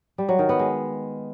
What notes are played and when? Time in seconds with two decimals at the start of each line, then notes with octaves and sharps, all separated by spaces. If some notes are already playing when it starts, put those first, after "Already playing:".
0.18 G3
0.29 F#3
0.39 D#3
0.49 B3
0.59 G#3